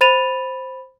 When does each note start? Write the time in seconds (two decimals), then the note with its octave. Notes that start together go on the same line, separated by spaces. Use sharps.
0.01 C5 B5 A6 D#7 F7